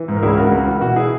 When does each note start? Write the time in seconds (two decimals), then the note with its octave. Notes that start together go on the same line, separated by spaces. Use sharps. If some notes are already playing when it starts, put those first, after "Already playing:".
Already playing: E3
0.08 G#2
0.17 A#4
0.23 C#2 E4 G#4
0.37 C#3 F#4 A#4
0.52 C#2
0.67 E3
0.81 B2 F#4
0.96 E4 G#4